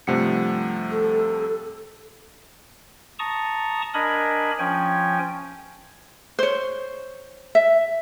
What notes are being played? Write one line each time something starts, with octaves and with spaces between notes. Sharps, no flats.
G2 C3 F3 A3 F#5 C#7
A4
A5 A#5 C#6 D#6
D4 A#4 D#5 G#5 B5
F3 C#4 G5 G#5
C5 C#5
E5